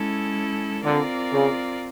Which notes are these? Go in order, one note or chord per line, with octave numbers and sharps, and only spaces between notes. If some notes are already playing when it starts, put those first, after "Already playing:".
Already playing: G#3 C#4 E4 A4
D3 C4 F4 A#4 D5
C#3